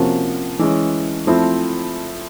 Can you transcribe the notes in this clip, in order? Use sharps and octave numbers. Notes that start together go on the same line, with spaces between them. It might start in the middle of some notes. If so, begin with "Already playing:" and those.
Already playing: C3 F3 A#3 C#4 F#4
E3 G#3 C#4
F3 A3 C4 E4